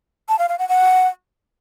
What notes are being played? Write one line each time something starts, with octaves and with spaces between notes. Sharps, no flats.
A5
F5
F5
F#5
F#5